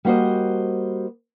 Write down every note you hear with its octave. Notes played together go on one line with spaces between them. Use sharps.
G3 A#3 F#4 C5 D#5